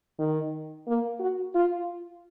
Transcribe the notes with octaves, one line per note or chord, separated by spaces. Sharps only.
D#3
A#3
F#4
F4